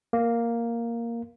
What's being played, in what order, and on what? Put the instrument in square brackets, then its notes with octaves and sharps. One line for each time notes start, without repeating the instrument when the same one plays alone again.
[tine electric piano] A#3